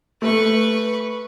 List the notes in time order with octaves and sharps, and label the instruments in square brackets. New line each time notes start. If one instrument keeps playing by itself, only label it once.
[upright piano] A3 [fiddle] B4 C#6